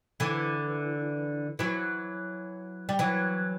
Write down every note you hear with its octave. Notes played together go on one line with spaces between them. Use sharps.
D3 E3
E3 F#3
G3
E3 F#3